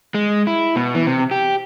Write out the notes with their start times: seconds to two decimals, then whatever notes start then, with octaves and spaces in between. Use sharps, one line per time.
0.14 G#3
0.47 E4
0.76 B2
0.95 E3
1.07 C3
1.31 G4